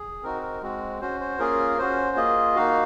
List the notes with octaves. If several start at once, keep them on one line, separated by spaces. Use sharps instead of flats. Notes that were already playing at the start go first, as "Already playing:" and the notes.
Already playing: G#4
C4 D#4 F#4 A#4
A#4
G#3 C4 F#4
C#4 F#4 C5
C5
A#3 C#4 F4 G#4 A#4
C#4 F#4 C5
A#3 F4 G#4 D#5
A#3 D#4 F#4 F5